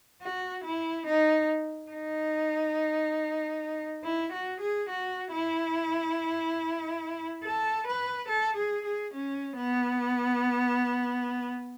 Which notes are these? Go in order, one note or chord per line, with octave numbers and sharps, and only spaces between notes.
F#4
E4
D#4
D#4
E4
F#4
G#4
F#4
E4
A4
B4
A4
G#4
G#4
C#4
B3